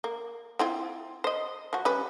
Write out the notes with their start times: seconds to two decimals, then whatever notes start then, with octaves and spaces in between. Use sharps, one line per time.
0.04 A#3
0.59 C4 E4 F4
1.24 C5 D#5
1.73 F3 F#4
1.85 G3 C#4 B4